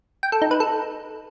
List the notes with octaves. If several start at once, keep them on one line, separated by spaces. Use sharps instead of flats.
G5
A4
D#4
B4
A4